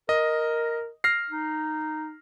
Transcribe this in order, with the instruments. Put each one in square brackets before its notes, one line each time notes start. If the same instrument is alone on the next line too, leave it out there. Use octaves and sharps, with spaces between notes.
[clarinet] A#4 [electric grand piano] D#5
[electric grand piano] F6 A#6 C7
[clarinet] D#4